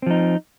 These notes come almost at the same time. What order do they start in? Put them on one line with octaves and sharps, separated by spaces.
C4 F3 D#4